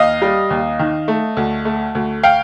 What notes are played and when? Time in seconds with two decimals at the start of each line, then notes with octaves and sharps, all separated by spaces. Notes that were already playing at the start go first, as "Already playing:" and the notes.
Already playing: D#2 D#5 F5
0.22 G3
0.50 D#2
0.79 D#3
1.08 A3
1.37 D2
1.65 A3
1.95 D2
2.23 F5 G5